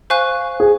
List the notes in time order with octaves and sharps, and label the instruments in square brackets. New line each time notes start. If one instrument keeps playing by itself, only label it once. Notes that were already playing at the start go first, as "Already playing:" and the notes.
[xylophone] C5 F5 G#5 C#6 F#6
[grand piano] G#4